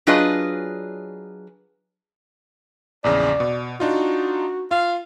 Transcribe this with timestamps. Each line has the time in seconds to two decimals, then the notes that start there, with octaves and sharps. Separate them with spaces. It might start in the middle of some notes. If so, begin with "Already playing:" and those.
0.07 F#3 D4 F4 G#4 B4 D#5
3.04 A#1 E2 C#3 D5
3.40 B2
3.80 D4 D#4 F4 F#4
4.71 F4 F5